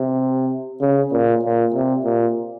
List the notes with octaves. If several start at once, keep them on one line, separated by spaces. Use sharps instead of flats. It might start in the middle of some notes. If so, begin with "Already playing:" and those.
Already playing: C3
C#3
A#2
A#2
C3
A#2